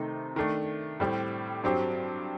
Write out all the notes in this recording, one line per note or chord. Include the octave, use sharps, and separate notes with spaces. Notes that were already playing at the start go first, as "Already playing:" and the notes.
Already playing: C3 D#3 A3 D#4
D#3 A3 D4
A2 G3 C4 G4
G2 F#3 C4 G4